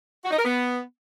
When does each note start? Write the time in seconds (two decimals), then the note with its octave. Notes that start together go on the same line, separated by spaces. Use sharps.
0.24 F#4
0.31 D#4
0.38 A#4
0.45 B3